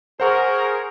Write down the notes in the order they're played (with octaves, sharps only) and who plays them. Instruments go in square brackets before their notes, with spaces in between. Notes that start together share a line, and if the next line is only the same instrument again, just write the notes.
[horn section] G#4 A#4 [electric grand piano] C5 F#5 C#6